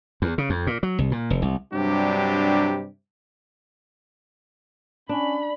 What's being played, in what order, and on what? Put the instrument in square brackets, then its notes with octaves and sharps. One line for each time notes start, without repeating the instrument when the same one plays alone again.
[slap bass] E2
C#3
F2
A#2
F#3
C2
A#2
F1
C2
[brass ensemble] G2 C3 F#3 G3 D4 G4
[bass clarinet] C#4 [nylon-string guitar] D4 [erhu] B5